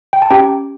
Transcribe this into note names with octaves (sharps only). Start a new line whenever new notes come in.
G5
A5
C#4 G4 G5 A#5